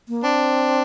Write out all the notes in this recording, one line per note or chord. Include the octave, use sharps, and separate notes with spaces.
A#3
C4 D4